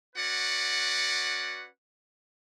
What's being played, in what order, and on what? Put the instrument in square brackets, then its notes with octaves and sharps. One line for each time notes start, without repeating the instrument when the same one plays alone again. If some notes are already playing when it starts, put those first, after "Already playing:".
[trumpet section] C#4 F#4 B4 D5 F#5